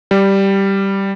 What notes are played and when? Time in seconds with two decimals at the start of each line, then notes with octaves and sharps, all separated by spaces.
0.11 G3